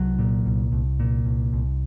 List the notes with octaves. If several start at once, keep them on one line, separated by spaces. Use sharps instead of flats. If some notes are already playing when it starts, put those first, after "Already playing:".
Already playing: C2 F#3
A#2
C2
C2
A#2
C2
C2